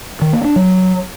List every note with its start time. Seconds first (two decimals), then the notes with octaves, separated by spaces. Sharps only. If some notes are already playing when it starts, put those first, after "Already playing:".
0.21 D#3
0.33 A#3
0.44 D4
0.56 F#3